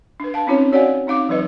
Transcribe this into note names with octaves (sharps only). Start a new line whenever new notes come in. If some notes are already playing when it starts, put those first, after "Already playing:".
D4 B4
F5 A5
C4 C#4 D#4 F4 C#5
F#4 C#5 D5 F5 F#5 G#5
C4 D#4 F5 D6
E3 F#3 D#4 B4 D#5